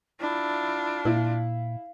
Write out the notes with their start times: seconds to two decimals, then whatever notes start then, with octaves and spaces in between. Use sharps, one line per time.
0.20 D4 E4 F4
1.05 A#2 E4 F5